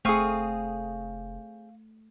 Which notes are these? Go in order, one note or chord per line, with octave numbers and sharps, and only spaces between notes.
F1 A3 C4 G#4 F5 C#6 D#6